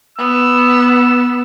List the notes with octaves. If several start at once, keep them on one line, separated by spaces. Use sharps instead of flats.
B3 E6